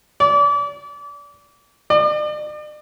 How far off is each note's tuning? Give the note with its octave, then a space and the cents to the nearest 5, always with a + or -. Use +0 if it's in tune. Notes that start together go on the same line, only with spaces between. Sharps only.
D5 -30
D5 +45